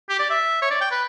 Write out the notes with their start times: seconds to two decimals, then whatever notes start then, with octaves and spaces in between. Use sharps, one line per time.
0.09 G4
0.19 D5
0.30 E5
0.62 C#5
0.70 D5
0.81 G5
0.91 B4